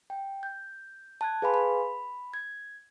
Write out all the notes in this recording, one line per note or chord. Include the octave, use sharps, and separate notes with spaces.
G5
G6
A5 F#6 G#6
G#4 B4 F5 G#5 B5 C6
B5
G#6